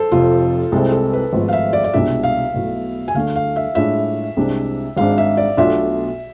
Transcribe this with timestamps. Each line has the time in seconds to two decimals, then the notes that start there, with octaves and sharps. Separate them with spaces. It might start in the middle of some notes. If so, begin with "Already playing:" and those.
Already playing: A4 C5
0.12 F1 F2 C3 F4
0.72 C2 C3 G#3 C4 E4 A4
0.92 A4
1.13 B4
1.33 G#1 G#2 F3 A3
1.48 F5
1.53 E5
1.73 D5
1.84 D5
1.94 C2 B2 G#3 D4 F4 E5
2.23 F5
2.54 B1 B2 A3 E4
3.08 G#5
3.15 D2 D3 A3 D4 F5
3.36 F5
3.56 E5
3.75 A2 G#3 D4 F4 E5
4.37 C2 C3 G#3 D4
4.97 G#1 G#2 G#3 D4 F5
5.18 E5
5.37 D5
5.57 B1 B2 A3 D4 F4 E5